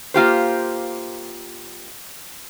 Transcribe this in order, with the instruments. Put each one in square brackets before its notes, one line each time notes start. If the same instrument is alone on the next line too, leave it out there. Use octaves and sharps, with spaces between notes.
[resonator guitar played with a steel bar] A#3 F4 G4 C5